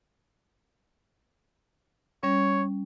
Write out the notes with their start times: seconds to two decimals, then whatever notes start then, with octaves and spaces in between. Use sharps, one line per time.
2.23 G3 C#4 C#5